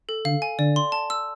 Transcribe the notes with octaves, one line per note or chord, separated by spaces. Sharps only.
A4
D3 F5
G#5
D3 D5
C6
A5
E6